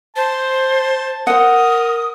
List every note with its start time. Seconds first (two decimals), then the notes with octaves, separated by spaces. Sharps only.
0.16 C5 A5
1.27 A#4 C5 F#5 D#6